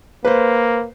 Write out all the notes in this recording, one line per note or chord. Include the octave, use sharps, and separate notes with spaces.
A#3 B4 C5